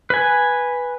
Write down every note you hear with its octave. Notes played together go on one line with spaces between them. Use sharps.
B4 G#5